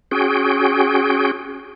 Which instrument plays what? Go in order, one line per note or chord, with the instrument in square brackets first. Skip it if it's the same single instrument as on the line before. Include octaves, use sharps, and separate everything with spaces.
[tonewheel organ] C#4 F#4 G#4 G5